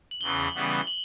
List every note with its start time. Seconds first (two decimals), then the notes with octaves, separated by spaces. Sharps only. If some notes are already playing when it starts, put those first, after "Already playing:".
0.11 F#7
0.21 E2 C#3 E3 G7
0.55 C#3 E3 G3 B3
0.87 F#7